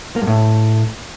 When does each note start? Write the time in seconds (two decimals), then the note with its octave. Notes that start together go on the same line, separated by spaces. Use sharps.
0.16 A#3
0.22 G2
0.27 A2